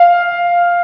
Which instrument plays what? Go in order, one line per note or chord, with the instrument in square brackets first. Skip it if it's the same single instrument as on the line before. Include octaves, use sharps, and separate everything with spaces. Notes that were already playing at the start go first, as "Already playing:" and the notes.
Already playing: [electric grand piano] F5